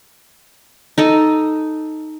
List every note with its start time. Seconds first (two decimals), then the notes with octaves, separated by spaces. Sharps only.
0.98 D#4 A4 D#5